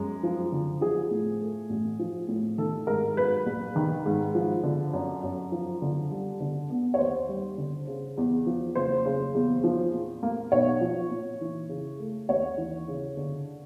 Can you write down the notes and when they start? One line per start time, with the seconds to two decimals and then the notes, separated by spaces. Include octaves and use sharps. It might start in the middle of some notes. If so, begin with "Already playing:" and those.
Already playing: F#2 G#3
0.23 F3
0.52 D3
0.81 F3 G#4
1.11 A2
1.41 A3
1.70 A1
1.99 F3
2.28 A2
2.58 D#3 A4
2.87 G#2 A#4
3.17 F#3 B4
3.46 A#1
3.76 D#3
4.06 G#2
4.35 F3
4.63 D3
4.93 F#2
5.23 F#2
5.52 F3
5.82 D3
6.11 G3
6.40 D3
6.70 B3
6.94 C#5
6.99 D#2 C5
7.29 G3
7.58 D3
7.87 C#3
8.17 E2
8.46 F3
8.75 F#1 C5
9.05 C#3
9.35 E2
9.64 F3
9.94 A#2
10.23 A#3
10.52 B1 C#5
10.81 F3
11.11 A#2
11.41 E3
11.69 C#3
12.00 A3
12.29 D#2 C#5
12.58 E3
12.88 C#3
13.17 D3